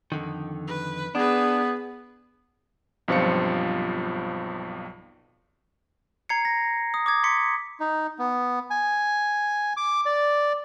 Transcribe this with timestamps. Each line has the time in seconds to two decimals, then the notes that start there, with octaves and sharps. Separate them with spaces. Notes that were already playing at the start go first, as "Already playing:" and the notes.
0.12 F2 D3 D#3
0.67 B4
1.15 B3 D4 G#4 B4
3.08 B1 G2 F3 C4 F4 C#7
6.29 A#5 G#6 C7 C#7
6.45 A#6
6.94 D#6
7.06 D6 D#6 G#6
7.24 C6 B6 C#7
7.80 D#4
8.19 B3
8.70 G#5
9.77 D6
10.06 D5